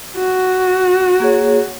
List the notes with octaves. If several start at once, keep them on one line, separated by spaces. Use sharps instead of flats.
F#4
A#3 G#4 C#5